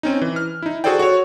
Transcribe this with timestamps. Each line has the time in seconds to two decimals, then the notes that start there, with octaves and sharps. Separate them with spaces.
0.03 C4 C#4 D#4
0.22 E3
0.36 F6
0.62 D#4 E4
0.84 F#4 G#4 A4 C5 D5 G5
0.99 F#4 C#5